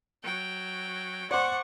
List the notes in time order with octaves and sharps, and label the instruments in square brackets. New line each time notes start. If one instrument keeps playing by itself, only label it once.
[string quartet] F#3 [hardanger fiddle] G5
[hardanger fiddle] C5 [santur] D5 C6 [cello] F#5 [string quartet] C#6